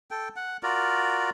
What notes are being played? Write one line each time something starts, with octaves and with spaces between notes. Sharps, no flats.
A4 G5
F#5
F4 F#4 A#4 D5